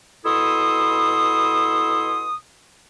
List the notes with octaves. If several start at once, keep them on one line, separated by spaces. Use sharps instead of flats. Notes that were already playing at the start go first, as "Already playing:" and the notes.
B2 E4 A4 C6 D#6